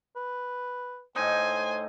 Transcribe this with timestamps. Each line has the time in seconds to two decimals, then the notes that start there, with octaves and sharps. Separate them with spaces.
0.16 B4
1.16 A2 D#4 C5 G#5